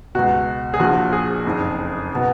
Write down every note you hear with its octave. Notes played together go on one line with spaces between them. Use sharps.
C#2 B2 F#4
G#4
A#1 A#2 F3 F#4
G#4
F#1 F2 D#3
B2